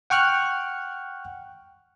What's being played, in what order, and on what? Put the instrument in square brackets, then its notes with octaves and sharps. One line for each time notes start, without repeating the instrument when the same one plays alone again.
[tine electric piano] F#5 G5 C#6 F6 F#6